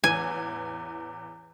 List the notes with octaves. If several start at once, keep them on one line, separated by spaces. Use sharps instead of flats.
A1 E2 E3 G#5